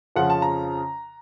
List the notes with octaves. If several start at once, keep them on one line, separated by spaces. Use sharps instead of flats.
F2 C#3 F3 F#5
A5
A#5